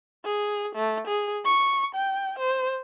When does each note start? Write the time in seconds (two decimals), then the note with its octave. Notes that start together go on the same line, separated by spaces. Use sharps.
0.25 G#4
0.75 A3
1.08 G#4
1.45 C#6
1.95 G5
2.39 C5